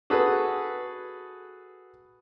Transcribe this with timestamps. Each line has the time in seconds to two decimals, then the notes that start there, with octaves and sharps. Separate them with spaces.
0.10 F#4 G#4 A4 B4